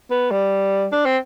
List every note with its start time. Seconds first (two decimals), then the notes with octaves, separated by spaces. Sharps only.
0.11 B3
0.31 G3
0.92 D4
1.05 C4